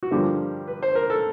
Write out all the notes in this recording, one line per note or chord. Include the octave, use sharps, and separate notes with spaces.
F#4
G2 D3 F3 A#3 G4
B4
C5
A#4
A4